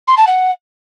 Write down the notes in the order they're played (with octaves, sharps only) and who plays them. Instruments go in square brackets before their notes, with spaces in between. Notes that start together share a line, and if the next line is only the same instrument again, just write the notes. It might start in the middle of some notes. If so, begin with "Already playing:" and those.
[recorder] C6
A5
F#5